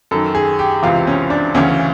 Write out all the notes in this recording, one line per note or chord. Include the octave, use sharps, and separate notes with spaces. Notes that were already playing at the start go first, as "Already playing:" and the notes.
F#2 D#3 A4
G#4
G4
C#2 C3 E3 F4
C#4
D4
D2 C#3 E3 C#4